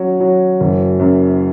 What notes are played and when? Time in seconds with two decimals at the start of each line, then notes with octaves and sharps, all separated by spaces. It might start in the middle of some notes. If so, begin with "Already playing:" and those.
Already playing: F#3 C#4
0.20 F#3
0.60 F#1
0.99 F#2